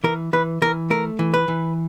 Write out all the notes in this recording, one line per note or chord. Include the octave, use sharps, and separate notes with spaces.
E3 A#4
E3 B4
E3 A#4
A3 A#4
E3
B4
E3